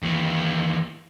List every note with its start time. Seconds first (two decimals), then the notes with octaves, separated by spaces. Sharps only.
0.03 D#2 E3